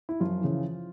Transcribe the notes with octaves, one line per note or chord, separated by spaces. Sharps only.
E4
F#2 F3 F4
C#3 E3